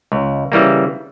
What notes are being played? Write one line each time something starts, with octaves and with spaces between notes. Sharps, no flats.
C#2
C#3 E3 G3 A#3